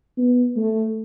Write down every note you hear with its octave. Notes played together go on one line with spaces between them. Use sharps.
B3
A3